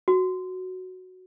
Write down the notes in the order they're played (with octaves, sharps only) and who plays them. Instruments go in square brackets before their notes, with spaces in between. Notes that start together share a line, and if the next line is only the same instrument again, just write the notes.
[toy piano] F#4